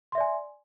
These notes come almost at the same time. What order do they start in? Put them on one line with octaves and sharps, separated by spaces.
C6 E5 D5 G#5